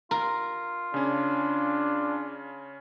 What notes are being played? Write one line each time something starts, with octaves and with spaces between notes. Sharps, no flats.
F4 A#4
C#3 C#4 D4